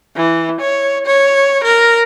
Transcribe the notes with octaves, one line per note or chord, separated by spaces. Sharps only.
E3
C#5
C#5
A#4